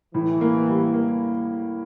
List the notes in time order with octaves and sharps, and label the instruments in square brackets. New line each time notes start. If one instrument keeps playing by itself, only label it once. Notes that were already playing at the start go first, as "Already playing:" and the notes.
[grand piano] A2 [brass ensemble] E3
[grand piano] A#3
G3
A#3